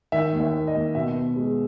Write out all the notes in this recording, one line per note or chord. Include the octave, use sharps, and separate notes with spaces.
D#3 E5
D#2
E5
A#3
D#5
D#2
B2 E5
B3
G#3